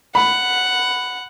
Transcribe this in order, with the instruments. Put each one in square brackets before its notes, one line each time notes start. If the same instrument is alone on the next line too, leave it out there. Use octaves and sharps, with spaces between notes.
[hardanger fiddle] F#5 [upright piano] B5